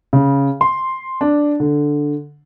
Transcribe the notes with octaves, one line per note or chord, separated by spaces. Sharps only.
C#3
C6
D4
D3